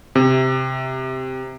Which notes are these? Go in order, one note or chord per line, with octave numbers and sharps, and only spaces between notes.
C3